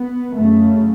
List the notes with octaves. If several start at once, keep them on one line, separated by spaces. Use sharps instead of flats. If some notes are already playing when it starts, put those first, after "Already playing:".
Already playing: B3
F#2 C#3 A3